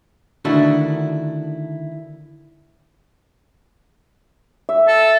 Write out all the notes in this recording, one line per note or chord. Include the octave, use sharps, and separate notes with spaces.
D3 D#3 A3 D4 E4 F#4
E5
A4